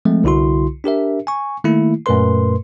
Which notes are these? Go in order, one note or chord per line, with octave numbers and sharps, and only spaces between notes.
F3 G#3 A3 C4
C2 D3 E4 F#4 C6
D4 G4 A#4 E5
G#5 C#6
D#3 A3 A#3 E4
F#2 A#2 A3 A#4 B4 C6